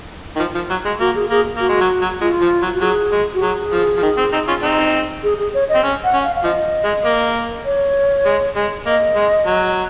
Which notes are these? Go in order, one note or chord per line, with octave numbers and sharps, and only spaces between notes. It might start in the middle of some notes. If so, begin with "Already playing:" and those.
D#3
F3
F3
F#3
G#3
A#3 F#4
G#4
A#3 G#4
A#3 F#4
G#3
F#3
F#3
G#3 F4
F3
F#3
F#4
F#3 G#4
G#3
F#4
F#3 G#4
F3
F3
D#3
C4
C4 D#4
C#4 F4
C4 D#4
G#4
G#4
C#5
D#5
C4
C#4
F#5
C#4
F5
F5
F3 D#5
G#3
A#3
C#5
G#3
G#3
A#3 D#5
G#3
F#3